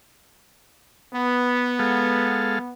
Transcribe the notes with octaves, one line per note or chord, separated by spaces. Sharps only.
B3
G#3 A4 F5